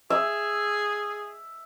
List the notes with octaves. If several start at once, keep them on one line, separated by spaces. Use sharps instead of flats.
G#4 E5